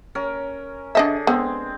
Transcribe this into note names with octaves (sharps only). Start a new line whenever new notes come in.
C#4 A#4
D3 D4 G#4 D#5 E5
G#3 B3 C4